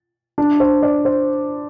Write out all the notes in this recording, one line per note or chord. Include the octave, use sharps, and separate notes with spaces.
D4
C5
D5
C5